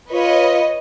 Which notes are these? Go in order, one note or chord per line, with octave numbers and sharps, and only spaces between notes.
F4 B4 C#5 D#5